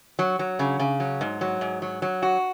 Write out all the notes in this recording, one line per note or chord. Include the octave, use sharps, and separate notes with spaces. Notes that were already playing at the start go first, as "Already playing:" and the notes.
F#3
F#3
C#3
C#3
F#3
G#2
F#3
G#2
F#3
F#3
F#4